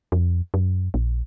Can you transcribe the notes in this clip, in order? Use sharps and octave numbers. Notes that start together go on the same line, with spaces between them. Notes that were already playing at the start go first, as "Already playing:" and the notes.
F2
F#2
A#1